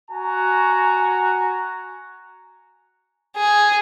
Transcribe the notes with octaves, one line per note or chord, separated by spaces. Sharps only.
F#4 G#5 A#5
G#4